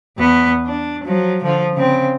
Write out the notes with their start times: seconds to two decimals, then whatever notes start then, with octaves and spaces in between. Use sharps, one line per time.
0.18 E2 B3
0.65 D4
1.04 F3 F#3
1.44 D3 F3
1.73 C#3 C4